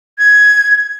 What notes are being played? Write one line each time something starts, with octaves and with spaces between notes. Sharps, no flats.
G#6